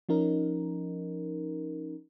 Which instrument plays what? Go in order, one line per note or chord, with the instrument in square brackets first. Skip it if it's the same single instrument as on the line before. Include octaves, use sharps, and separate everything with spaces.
[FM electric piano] F3 C#4 D#4 A#4